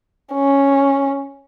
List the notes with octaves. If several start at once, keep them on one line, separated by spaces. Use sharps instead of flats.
C#4